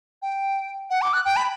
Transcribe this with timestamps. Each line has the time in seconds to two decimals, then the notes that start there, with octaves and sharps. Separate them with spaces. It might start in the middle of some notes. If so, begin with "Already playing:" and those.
0.22 G5
0.90 F#5
1.02 D6
1.13 F#6
1.25 G5
1.36 B5